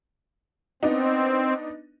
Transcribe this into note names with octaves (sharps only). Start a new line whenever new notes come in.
B3 C4 D4 D#4